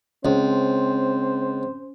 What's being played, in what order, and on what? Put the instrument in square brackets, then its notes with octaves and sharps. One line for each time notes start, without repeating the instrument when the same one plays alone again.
[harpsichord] C#2 [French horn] C4 [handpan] C#4 [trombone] C5